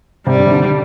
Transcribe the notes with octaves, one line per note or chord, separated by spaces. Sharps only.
C3 G3
D3
C3
D3